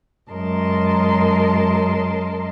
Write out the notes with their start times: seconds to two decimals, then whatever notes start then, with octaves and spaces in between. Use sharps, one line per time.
0.31 F#2 G#3 A#4 D#5 A5 C6